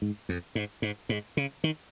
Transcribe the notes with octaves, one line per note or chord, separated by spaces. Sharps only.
G#2
F2
G#2
G#2
G#2
C#3
D#3